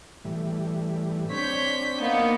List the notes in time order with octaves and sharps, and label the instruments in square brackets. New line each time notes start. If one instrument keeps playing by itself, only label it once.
[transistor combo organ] A2 E3 G3
[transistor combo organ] C4 D4 [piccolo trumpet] C#5 [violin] G6 B6
[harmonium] A#3 [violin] B3 [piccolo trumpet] D#4